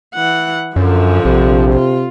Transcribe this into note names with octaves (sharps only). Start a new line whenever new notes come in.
E3 F#5
F#2 D3 F3
A#1 C3
F4